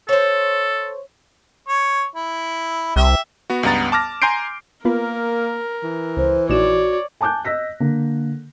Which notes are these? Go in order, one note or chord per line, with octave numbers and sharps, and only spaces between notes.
A4 C5 C#5
C#5
E4
C2 G4 E5
B3 F#4
C#2 G2 B3 A#5 A6
A5 D6 F6 A#6
G#5 A#5 C6 G6 C7 D7
A#3 B3 F4 A#4 B4
E3
C#2 C5
A#1 D#4 F#4 C#5 D5 E7
G#5 A5 D6 F#6 G6
D#5 E6 A#6 B6
D3 A#3